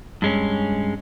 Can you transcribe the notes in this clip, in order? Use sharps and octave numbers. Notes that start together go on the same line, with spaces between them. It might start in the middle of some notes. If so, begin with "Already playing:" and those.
G2 G#3 C#4